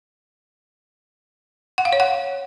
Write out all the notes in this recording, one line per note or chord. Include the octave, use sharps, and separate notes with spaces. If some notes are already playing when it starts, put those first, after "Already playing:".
F#5
F5
C#5
F#5